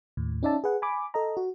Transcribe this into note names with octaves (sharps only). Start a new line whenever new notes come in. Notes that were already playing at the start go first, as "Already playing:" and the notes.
D#2 A2
C#4 D#4 D5 E5 A5
G#4 B4 F#5
G#5 B5 D6
A4 D#5 A#5
F#4